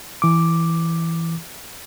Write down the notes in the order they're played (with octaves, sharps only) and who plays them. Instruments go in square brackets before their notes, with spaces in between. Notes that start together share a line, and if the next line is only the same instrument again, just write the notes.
[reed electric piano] E3 D6